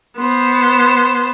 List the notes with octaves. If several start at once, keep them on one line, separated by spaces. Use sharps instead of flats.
B3 C5